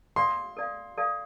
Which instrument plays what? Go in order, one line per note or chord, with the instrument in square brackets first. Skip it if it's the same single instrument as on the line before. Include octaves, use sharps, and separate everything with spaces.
[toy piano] A4 D5 F5 [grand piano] C6
[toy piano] A4 D5 F5
A4 D5 F5